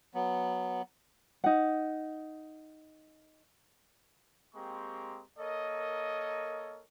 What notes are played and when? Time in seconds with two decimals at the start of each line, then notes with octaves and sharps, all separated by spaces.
0.14 F#3 B3
1.44 D#4 F#5
4.55 G#3 A#3 C4 G4 A#5 C#6
5.39 A#3 A4 A#4 C#5 D#5